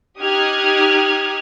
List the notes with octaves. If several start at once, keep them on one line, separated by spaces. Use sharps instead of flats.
D#4 G4 D#6 F6 F#6 G#6